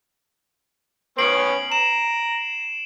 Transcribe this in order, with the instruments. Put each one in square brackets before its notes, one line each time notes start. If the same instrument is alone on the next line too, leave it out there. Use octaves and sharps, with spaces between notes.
[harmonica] B3 C#4 [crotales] C7 D7 F#7
[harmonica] A#5 [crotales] E7